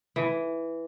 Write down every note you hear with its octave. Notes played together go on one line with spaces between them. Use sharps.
E3